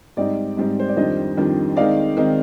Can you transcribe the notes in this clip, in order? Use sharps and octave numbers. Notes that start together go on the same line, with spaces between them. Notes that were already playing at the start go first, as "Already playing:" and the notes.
G#2 G3 C4 D#4 D5
G#2 G3 C4 D#4
C5
D5
F2 D#3 G3 D4 C5 D#5
F2 D#3 G3 D4
D#3 G#3 C4 D#4 D5 F5
D#3 G#3 C4 D#4